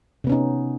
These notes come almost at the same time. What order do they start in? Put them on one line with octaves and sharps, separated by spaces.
C3 B3 C#4 D#4